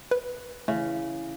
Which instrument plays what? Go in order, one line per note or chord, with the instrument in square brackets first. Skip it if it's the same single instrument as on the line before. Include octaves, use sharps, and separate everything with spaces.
[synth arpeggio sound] B4
[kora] C#3 [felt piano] E3 [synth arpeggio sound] A3